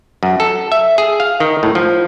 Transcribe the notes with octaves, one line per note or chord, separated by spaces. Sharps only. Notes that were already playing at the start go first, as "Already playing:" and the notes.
F#2
A4
E5
G#4
F5
D#3
A2
F3